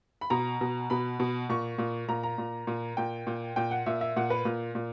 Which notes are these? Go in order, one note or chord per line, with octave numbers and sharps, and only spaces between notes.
B5
B2 A#5
B2
B2 B5
B2
A#2 C#6
A#2
A#2 A#5
A#5
A#2
A#2
A#2 G5
A#2
A#2 G5
F#5
A#2 E5
E5
A#2 F#5
B4
A#2
A#2